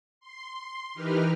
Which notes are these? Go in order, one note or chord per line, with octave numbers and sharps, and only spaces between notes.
C6
E3 D#4 G4 A#4 B4 F6